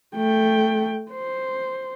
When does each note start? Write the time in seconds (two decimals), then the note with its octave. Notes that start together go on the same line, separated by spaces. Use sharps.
0.15 A3 G5
1.12 C5